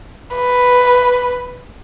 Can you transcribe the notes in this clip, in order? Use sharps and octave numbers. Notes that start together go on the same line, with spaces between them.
B4